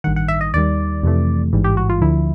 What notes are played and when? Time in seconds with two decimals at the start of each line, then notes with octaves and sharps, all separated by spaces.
0.04 A1 G2 D#3 F#5
0.16 F#5
0.28 E5
0.41 D#5
0.54 D#2 D#3 G3 D5
1.03 F2 C3 E3 A3
1.53 A1 G#2 E3 G3
1.64 G4
1.77 F#4
1.89 F4
2.01 D2 D3 F3 E4